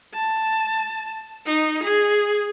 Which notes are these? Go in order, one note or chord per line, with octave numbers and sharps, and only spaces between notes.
A5
D#4
G#4